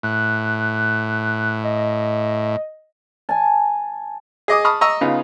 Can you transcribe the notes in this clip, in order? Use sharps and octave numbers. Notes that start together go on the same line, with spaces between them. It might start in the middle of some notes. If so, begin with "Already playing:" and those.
A2 F#6
D#5
G#5 A5
G#4 D#5 D6 D#6
A5 B5 C#6 D#6 F6
D#5 A#5 C#6 D#6 E6
C#3 B3 D#4 F4